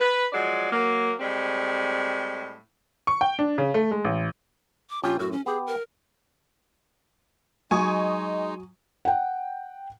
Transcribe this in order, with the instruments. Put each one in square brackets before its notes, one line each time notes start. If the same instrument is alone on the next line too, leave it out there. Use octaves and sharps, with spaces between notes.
[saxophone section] B4
F3 F#3 G#3 D5
F#3 A#3
A2 G3 G#3 C4
[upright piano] C#6
G5
D4
C#3
A3
G#3
A1
[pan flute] D6
[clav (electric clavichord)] A#1 C#4 G4 [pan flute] F4
[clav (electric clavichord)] F#2 A2 [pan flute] F#4
[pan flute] C#4
[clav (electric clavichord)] B3 G4 [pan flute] G#4
[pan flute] A#4
[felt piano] F#3 [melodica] G#3 D#4 [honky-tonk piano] G#5 C#6 D#6
[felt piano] F#5 G5